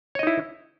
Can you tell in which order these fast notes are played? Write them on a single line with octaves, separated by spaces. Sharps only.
C#5 D#5 D#4 E4